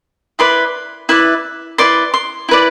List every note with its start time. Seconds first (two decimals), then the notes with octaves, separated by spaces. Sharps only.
0.39 E4 B4 D5 C6
1.09 E4 B4 D5
1.78 E4 B4 D5 C6
2.14 C6
2.49 E4 B4 D5